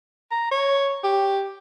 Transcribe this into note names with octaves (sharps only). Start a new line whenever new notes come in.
A#5
C#5
G4